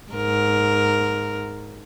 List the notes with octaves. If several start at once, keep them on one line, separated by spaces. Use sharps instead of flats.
G#2 A#4